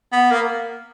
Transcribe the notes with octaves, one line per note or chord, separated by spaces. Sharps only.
B3
A#3